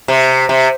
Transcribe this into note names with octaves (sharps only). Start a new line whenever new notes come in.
C3
C3